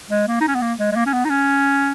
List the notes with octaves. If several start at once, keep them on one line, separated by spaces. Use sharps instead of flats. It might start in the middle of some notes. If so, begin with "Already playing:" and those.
G#3
A#3
D#4
C#4
B3
A#3
G#3
G#3
A#3
C#4
B3
D#4
C#4